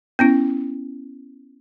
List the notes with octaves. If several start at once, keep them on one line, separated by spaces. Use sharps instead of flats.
B3 C#4 E4